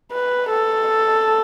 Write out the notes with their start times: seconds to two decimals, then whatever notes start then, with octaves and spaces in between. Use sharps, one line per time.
0.12 B4
0.50 A4